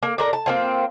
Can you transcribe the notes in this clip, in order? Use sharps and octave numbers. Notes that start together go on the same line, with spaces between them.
A#3
D4 A#4 A#5
A5
A#3 C4 F4